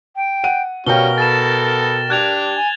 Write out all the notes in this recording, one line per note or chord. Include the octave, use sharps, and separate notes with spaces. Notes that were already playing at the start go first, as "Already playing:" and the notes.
G5
F#5 D#7
B2 G3 C#4 F#4 A#4 F5 G5 G7
B3 A4 A6 E7
D4 G4 F#6 G#6 F7
G#5